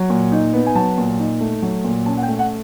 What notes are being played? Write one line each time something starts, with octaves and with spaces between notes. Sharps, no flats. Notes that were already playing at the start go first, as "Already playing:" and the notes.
Already playing: F#3
A#2
D#4
B3
G#5
F#3 A5
A#2
D#4
A3
F#3
A#2
C#4 A5
F#5
G5
A3
F#5